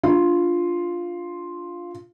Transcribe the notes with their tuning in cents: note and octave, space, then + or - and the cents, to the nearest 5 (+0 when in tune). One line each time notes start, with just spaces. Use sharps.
D4 +0 F4 +0